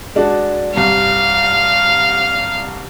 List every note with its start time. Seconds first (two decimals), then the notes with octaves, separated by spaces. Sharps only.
0.15 G#3 D4 F#4
0.74 C2 G2 F5